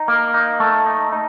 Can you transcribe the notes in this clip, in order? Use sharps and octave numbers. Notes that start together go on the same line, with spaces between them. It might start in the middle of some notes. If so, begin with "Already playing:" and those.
Already playing: D#4
A#3
D#4
A3
D#4
D#4